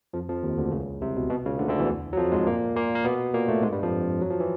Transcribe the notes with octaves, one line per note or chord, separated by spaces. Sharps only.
F2 F3
F2 F3
D#2 D#3
D2 D3
C#2 C#3
C2 C3
B2
B2
C#2 C#3
D2 D3
D2 D3
E2 E3
F#3
F2 F3
G#2 G#3
A#2 A#3
A#2 A#3
A#3
B2 B3
A#2 A#3
A2 A3
G#2 G#3
G2 G3
F2 F3
F#3
F3
E3